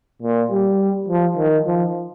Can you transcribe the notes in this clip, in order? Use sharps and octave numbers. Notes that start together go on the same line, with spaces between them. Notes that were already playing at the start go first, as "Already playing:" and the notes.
A#2
G3
F3
D#3
F3